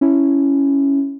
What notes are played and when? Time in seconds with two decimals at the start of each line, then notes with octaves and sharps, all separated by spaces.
0.01 C#4 E4